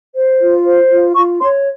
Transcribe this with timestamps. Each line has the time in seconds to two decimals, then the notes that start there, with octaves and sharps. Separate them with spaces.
0.15 C5
0.40 F4
0.65 C5
0.90 F4
1.15 F4 C#6
1.41 C#5 C6